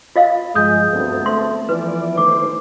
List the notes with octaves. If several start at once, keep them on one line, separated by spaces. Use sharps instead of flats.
F4 D#5 F5
G2 F3 G#3 D#6 G6
D2 B3 C4 A4
A3 C6
E3 F3 B3 B4 D5
D#3 A3 C5 D6